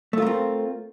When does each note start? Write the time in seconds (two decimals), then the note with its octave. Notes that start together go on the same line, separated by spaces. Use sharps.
0.13 A3
0.18 F4
0.22 A#4
0.27 C4